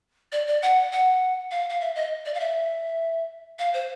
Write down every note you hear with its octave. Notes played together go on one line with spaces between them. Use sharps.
D5
D5
F#5
F#5
F5
F5
E5
D#5
D5
F5
E5
F5
C5